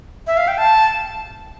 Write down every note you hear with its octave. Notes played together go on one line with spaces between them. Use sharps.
E5
F5
G5
A5